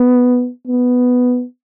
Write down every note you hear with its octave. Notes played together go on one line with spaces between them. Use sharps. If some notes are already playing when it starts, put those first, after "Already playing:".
Already playing: B3
B3